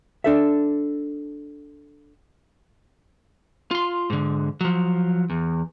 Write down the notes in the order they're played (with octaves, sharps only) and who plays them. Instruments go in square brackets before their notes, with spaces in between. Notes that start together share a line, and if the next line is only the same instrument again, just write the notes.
[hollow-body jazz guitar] D4 A4 E5
[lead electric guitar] F4 C6
G#2 D3
F3 F#3
E2